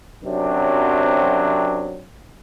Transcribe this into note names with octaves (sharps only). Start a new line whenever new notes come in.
F#2 C3 F#3 C4 D4